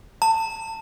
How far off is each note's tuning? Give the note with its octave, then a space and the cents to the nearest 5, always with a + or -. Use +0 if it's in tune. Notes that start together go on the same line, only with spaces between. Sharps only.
A5 +30